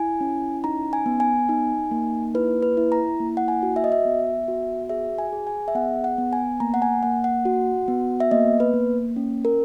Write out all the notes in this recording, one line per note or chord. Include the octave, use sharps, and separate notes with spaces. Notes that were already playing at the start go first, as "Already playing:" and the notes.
Already playing: E4 G#5
C#4
D#4 A#5
G#5
B3
G#5
D#4
A#3
E4 B4
B4
E4
A#5
A#3
F#5
G#5
F#4
E5
D#5
E5
B3
F#4
G#4 E5
G#5
G#4
G#5
E5
B3 F#5
F#5
B3
G#5
A#3 A#5
F#5
G#5
A#3 F#5
F#5
F#4
B3
E5
A#3 D#5
B4
A#3
C#4
A#4